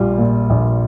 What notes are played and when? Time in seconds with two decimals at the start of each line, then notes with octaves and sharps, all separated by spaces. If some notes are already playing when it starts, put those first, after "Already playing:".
Already playing: A#1 G3 F4
0.18 A#2
0.50 A#1